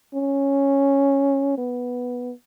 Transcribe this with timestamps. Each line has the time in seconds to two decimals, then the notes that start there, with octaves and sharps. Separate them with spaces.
0.14 C#4
1.58 B3